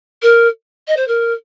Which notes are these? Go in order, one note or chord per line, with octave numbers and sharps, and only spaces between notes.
A#4
D#5
C5
A#4